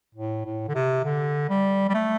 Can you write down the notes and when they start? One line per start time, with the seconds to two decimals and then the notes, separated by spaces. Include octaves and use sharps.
0.15 A2
0.45 A2
0.68 D3
0.75 C3
1.05 D3
1.49 G3
1.89 G3
1.94 A3